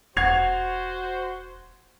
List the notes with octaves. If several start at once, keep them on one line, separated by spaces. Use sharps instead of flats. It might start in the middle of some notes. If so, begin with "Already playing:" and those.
E1 F#4 C5 F#5 C#6 G#6 C7 F7